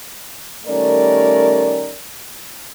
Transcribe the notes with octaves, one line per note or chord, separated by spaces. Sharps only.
D#3 G3 A3 C#4 A#4 D5